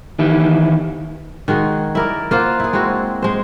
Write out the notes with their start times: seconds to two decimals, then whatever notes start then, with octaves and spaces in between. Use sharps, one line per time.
0.19 D#3 E3 D#4 E4 G4
1.48 D#3 G#3 F#4 G#4
1.95 E4 A#4 D5
2.31 A#3 F4 C5 F#5
2.60 E4 G#4
2.73 G#3 C4 E4 F#4
3.22 G#3 C5